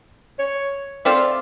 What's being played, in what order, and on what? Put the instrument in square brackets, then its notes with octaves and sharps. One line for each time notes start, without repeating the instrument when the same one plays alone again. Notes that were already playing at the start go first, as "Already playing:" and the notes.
[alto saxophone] C#5
[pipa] A3 C4 F4 [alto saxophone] D5